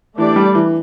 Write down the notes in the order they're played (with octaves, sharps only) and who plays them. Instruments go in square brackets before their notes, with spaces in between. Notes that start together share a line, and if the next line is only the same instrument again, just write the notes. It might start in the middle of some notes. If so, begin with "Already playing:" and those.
[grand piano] E3 [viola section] A3 D4 G4 D5
[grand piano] G3
E3